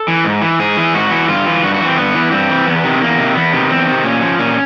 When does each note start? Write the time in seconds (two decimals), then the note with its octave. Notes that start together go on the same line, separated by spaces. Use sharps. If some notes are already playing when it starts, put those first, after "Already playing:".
Already playing: A4
0.08 E3
0.25 G#2
0.42 E3
0.59 G#2 G#4
0.77 E3
0.94 G#2 F#4
1.11 E3
1.28 G2 F4
1.46 E3
1.63 G2 F#4
1.74 F#4
1.81 E3
1.86 C4
1.97 G2 B3
2.15 E3
2.32 G2 C4
2.50 E3
2.66 E2 B3
2.84 C3 D#3
3.00 E2 A#3
3.18 C3 D#3
3.35 E2 B3
3.53 C3 D#3
3.70 E2 C4
3.87 C3 D#3
4.04 A#2 C#4
4.22 F3
4.39 A#2 C#4